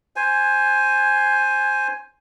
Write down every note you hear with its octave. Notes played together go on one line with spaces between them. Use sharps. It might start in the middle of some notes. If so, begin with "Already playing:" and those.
C5 G#5